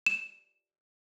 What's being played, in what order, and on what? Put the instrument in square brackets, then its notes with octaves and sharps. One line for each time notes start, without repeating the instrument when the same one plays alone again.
[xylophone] E7